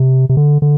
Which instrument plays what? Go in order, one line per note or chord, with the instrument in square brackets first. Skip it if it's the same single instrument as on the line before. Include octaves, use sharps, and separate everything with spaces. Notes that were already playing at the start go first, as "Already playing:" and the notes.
Already playing: [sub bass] C3
C3
D3
D3